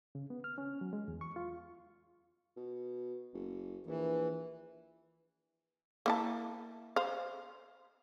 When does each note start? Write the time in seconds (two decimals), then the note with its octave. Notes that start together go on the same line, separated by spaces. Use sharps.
0.15 C#3
0.30 B3
0.44 F6
0.58 C#4
0.81 F#3
0.93 G#3
1.08 E2
1.21 C#6
1.36 F4
2.57 B2
3.34 F#1
3.86 A#1 E3
6.06 A#3 E4 A5
6.96 C5 F5